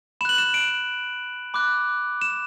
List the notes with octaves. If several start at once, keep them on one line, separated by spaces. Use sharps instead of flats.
B5 F#6 E7 F#7
E7
D7
B5 D6 F#6
E7